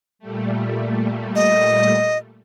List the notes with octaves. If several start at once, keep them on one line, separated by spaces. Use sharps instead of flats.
A#2 G3 A3
D#5